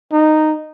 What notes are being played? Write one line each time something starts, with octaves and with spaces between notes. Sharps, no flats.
D#4